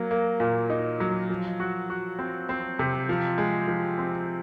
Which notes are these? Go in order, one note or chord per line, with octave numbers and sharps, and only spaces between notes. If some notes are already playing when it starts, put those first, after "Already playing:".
Already playing: F#3 A#3
A#3
A#2
D#4
F#3
F3
F#4
F#4
C4
C4
C3
F3
G#3
F3
C4